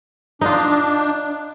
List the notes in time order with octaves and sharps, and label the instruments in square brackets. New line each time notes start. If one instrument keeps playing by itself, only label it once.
[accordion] D4 [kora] D#4 F4